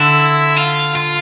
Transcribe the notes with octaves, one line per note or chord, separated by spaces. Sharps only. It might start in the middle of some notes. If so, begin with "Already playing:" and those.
Already playing: D3 E4
F4
F4